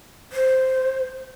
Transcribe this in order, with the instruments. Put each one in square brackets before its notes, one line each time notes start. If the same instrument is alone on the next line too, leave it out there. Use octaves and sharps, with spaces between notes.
[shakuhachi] C5